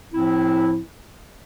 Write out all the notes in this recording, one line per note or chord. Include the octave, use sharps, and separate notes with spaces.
A2 F3 C4 E4